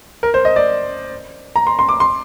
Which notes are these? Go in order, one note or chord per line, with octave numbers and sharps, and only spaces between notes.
A#4
C5
D#5
D5
A#5
C6
C6
D6
C6